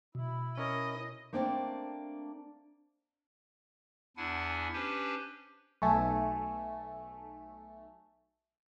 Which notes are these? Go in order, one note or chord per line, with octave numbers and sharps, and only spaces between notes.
B2 E4
C#4 A#4 C#5 D#5
A3 A#3 C4 D4 C5 G5
E2 D4 E4 F#5 G#5
C#4 D4 G4 B4 C5
B1 A3 G#5 A5 C#6